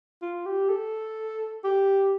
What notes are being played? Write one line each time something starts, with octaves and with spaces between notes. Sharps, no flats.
F4
G4
A4
G4